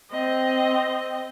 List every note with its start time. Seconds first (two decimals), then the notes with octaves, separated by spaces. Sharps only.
0.11 C4 D#5